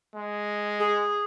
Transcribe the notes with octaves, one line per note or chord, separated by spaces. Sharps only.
G#3
G#4